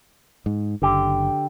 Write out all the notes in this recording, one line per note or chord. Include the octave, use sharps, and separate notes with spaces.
G#2
F#1 D3 G4